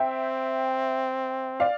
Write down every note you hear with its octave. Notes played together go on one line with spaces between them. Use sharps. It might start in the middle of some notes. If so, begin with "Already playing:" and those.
Already playing: C4 E5 G5
D5 F5